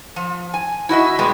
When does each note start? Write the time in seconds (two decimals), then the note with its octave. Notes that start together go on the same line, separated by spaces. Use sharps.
0.16 F3
0.54 G#5
0.89 E4 F#4 D#5 E5
1.19 A#2 G3 G#3 B3